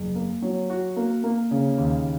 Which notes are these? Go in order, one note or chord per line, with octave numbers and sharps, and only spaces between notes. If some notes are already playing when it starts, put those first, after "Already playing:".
Already playing: F#1
A#3
F#3
F#4
A#3
A#3
C#3
D#2